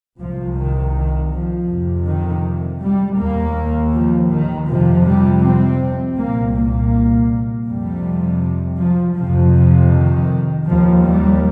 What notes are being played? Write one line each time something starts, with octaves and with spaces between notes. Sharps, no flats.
C2 C3 F3
D#3
D#3
F3
F2 C3
D#3
G3
D#2 A#3
F3
D#3
F2 C3 F3
G3
C4
C2 A#2 A#3
A#3
F2 C3 G3
F3
F2 C3 F3
F3
D#3
D#2 F3
G3